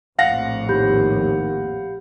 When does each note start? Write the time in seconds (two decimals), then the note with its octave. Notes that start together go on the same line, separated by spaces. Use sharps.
0.19 A#1 F2 A2 F5 F#5 A#6
0.69 D#2 G4 B5 G6